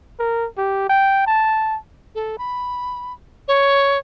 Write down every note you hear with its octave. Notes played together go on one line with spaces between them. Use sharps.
A#4
G4
G5
A5
A4
B5
C#5